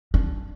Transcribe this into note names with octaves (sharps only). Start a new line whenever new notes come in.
D4